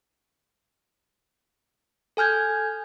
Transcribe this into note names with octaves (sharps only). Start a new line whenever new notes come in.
A4 G#5 F6 G6 G#6